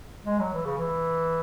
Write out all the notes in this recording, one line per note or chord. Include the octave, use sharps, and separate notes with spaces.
G#3
F#3
E3
C#3
E3